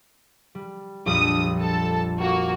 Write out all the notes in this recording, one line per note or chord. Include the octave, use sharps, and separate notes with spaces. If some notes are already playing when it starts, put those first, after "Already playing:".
G3
A#1 F2 G3 D#6
A4 A5
A#3 F#4